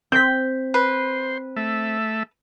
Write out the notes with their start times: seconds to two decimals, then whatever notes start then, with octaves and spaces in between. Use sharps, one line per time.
0.12 C4 G6 B6
0.74 B4 C5
1.56 A3 E5